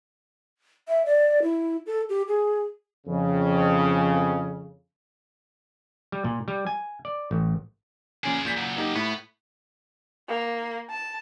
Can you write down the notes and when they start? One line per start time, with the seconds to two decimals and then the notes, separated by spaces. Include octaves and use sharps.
0.88 E5
1.06 D5
1.42 E4
1.87 A4
2.09 G4
2.28 G#4
3.07 F2 C#3
6.12 G3
6.24 A#2
6.48 G3
6.67 G#5
7.05 D5
7.31 A1
8.24 A#2 C#4 G#4 D5 G#5
8.45 A#2 G6 B6
8.58 C#3 F#3
8.76 A#3 D#4 G4
8.95 A2 B3
10.28 A#3
10.90 A5